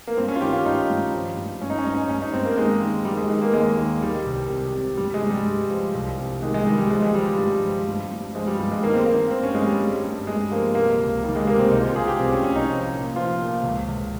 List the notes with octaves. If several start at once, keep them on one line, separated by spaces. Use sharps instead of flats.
A#3
G2 C4
C#4
F4
D#3 G4
F4
G2 D#4
G2
F3
G2
G2 C#4
D#4
C#4
G2 D#4
C#4
G2 C#4
D#4
G2 C4
A#3
D#3 G#3
D#3
D#3 G3
G#3
D#3 G#3
A#3
D#2 G#3
D#3
D#3 G3
C2
C3
C3
G2 G3
G#3
G2
G3
G2
F3
C2
C3
D#3 G#3
G#3
D#3 G3
G3
F3 G#3
G#3
F3 G3
G3
G2
F3
G2
G2
F3 G#3
G3
G2 G3
G#3
D#3 A#3
C4
D#3 A#3
G2 C4
C#4
G2 G#3
G3
G2
G2
G2 G#3
F3 A#3
C3 A#3
C#2
D#3 G3
G#3
C3 A#3
C4
C2 D#4
F4
C3 G#4
G4
C2 C4
C#4
C2 C#4
D#4
F3
A#2
F3 F4
A#2
C#2
C#2